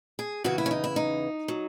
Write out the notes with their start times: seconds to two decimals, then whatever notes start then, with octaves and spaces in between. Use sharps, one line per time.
0.19 G#4
0.44 E2 C#3 E3 F#4
0.58 E4
0.66 C#4
0.71 D#4
0.84 E4
0.96 D#4
1.48 F#3